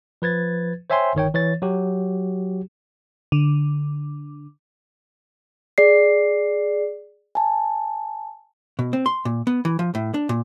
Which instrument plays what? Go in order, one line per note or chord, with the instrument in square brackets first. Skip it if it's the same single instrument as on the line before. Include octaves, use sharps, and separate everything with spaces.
[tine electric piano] F3 B4 G#6 A6
C5 C#5 E5 G5 G#5 C6
G1 D#3 C#5 G5
E3 C#5 A6
F#3 F#4 G4
[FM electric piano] D3
[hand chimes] G#4 D5 C7
G#5 A5
[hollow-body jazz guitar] B2
C4
C6
A#2
B3
E3
F3
A2
D4
A#2